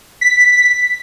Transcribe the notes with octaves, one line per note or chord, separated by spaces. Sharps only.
B6